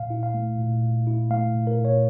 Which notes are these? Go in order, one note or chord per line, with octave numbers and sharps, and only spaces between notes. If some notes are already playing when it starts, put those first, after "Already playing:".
Already playing: A#2 F5
E4
F5
A3
A#2
A#2
E4
A3 F5
A#2
A#4
A#2
C#5